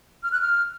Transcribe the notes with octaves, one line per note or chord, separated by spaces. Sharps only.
F6
F#6
F6